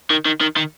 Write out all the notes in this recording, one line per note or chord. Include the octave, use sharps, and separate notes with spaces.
D#3
D#3
D#3
D#3